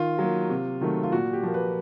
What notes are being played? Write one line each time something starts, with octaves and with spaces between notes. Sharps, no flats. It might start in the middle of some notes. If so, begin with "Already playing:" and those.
Already playing: D#3 F4
F#3 A#3
C3
D#3 F#3 A3
F4
A#2 F#4
G4
F3 A#3
B4